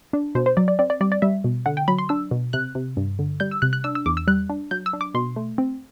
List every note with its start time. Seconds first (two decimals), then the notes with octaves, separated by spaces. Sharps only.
0.13 D4
0.35 B2 C5
0.46 C5
0.57 F#3 D5
0.68 D5
0.79 C4 D5
0.90 D5
1.01 G3 D5
1.12 D5
1.22 G3 E5
1.44 B2
1.66 D3 F#5
1.77 G5
1.88 F#3 B5
1.98 C6
2.09 D4 E6
2.31 B2
2.53 C3 F#6
2.75 C3
2.97 G2
3.19 D3
3.40 G3 G6
3.51 E6
3.62 C3 F#6
3.73 F#6
3.84 D4 E6
3.95 E6
4.06 E2 D6
4.17 E6
4.28 G3 F#6
4.50 D4
4.71 F#3 G6
4.86 E6
4.93 D4
5.01 D6
5.14 B2 C6
5.36 A3
5.58 C4